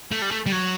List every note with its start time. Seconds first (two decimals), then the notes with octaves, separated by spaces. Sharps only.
0.11 A3
0.22 G3
0.31 A3
0.46 G3
0.52 F#3